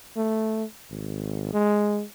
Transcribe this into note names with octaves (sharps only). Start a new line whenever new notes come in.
A3
G#1
G#3